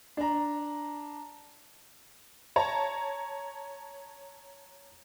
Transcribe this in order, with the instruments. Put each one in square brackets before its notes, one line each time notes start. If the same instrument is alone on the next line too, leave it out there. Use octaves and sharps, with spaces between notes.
[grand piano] D4 A#5
[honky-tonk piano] C#5 A5 A#5